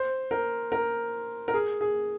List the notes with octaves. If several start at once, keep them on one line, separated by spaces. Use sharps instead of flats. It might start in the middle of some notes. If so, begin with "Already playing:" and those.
Already playing: C5
A#4
A#4
A#4
G#4
G#4